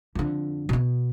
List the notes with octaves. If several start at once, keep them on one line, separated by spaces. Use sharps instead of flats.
F2 D3
B2 B3